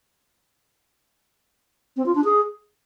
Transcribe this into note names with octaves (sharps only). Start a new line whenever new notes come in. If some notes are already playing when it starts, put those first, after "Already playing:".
C4
F4
D4
G#4